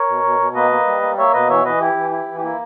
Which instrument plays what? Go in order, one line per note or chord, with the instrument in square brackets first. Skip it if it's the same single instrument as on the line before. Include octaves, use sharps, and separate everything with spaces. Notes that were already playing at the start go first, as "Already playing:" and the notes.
Already playing: [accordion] A#4 C#5
B2
B2
B2
A#3 B4 D#5
A#3
G3
A#3
A#3 C#5 E5
B2 B4 D#5
E3 C#5 E5
E3 B4 D#5
E4 G4
E3
E4
E3
G4
A#3 E4